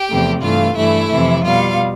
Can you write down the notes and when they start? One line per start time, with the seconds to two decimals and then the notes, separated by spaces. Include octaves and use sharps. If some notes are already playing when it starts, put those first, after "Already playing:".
Already playing: G4 G5
0.08 E2 C3 F3 A3
0.42 G2 E3 A3 F4 F5
0.76 G2 E3 A3 E4 E5
1.11 F2 C3 E3
1.44 B2 G3 F4 F5